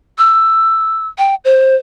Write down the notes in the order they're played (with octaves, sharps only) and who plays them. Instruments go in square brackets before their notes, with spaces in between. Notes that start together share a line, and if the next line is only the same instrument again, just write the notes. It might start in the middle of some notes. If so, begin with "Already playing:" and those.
[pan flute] E6
G5
C5